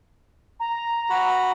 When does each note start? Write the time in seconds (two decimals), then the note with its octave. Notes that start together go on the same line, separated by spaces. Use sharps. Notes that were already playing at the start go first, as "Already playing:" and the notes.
0.60 A#5
1.10 F#4 F#5 B5